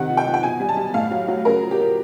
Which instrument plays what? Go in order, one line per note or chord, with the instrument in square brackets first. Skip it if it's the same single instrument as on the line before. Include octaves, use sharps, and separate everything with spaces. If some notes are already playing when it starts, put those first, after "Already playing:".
Already playing: [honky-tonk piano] C3 D#3 F#5
F3
G5
F3
G5
B2 G#5
G3
A5
G3
A2 F5
F#3
F#3
C#3 A#4
F3
G4
F3